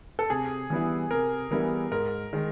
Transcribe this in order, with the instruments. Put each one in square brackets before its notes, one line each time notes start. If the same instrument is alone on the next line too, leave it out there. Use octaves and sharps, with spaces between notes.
[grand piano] A4
[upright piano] C3 [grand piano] G#4
[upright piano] E3 G3 B3 E4
[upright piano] C3 [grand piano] A#4
[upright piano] E3 G3 B3 E4 [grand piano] A#4
[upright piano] G#2 [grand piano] A#4
[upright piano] D#3 G#3